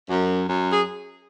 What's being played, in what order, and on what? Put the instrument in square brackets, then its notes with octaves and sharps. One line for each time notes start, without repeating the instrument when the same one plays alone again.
[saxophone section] F#2
F#2
G#4